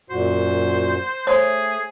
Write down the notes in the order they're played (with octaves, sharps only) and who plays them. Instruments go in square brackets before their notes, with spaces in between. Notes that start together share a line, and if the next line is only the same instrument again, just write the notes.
[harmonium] F#2 A#2 F#4 [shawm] C5
[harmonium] A3 [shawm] G#4 [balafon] C5 C#5 C6